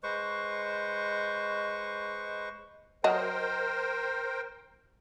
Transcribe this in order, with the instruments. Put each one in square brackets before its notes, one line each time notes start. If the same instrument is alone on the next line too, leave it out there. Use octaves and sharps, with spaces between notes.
[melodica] G#3 B4 C5 C#6
[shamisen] F#3 F#4 D#5 [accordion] A#4 C5 G5